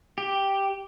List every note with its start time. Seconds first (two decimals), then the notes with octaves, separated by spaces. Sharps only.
0.18 G4